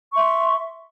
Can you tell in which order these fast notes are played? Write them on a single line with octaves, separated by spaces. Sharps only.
C#6 C6 E5